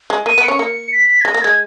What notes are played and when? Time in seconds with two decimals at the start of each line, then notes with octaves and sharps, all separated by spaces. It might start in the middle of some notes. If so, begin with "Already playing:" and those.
0.10 G#3
0.26 A#3 D#7
0.38 B3
0.43 C#7
0.48 C#4
0.59 A#3
0.92 B6
1.21 G#6
1.25 G#3 A#6
1.34 A#3
1.42 G#3 G#6